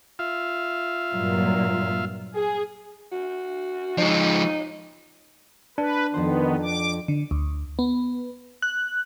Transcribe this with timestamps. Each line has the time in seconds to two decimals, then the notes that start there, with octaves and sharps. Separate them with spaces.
0.19 F4 E5 F5
1.12 G2 A#2 F#3
2.34 G#4
3.12 F#4
3.98 F3 G#3 D#4
5.78 D4 B4
6.14 F2 D#3 F3 B3 C5
6.63 D6
7.08 D3
7.31 D2
7.79 B3
8.62 F#6